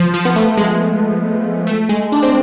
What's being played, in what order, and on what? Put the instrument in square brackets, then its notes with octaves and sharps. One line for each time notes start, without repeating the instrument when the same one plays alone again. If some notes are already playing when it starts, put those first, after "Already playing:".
Already playing: [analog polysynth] F3
F3
B3
A3
G#3
A3
G#3
D4
C4